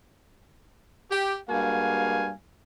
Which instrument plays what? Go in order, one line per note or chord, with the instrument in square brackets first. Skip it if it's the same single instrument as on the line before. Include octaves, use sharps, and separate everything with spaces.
[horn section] G4
G2 G#3 A#3 F#4 F5 G#5